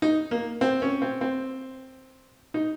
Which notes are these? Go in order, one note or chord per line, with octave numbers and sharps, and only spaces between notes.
D#4
A#3
C4
C#4
C4
C4
D#4